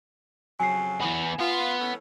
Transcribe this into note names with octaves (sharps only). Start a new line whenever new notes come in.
F2 C#3 F#3 G#5 C7
E3 B3
B3 F4
E3 A3 C#4